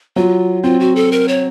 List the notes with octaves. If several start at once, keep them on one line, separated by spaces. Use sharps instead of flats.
F#3 F4
C4 F4
F#4
A4
A#4
C#5